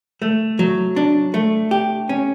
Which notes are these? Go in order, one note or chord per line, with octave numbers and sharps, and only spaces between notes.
A3
F#3
D4
A3
G4
C#4